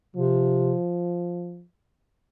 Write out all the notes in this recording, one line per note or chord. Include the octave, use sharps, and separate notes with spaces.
C3 F3